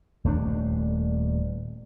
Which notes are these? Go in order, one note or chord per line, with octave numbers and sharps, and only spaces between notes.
D#1 A3 D4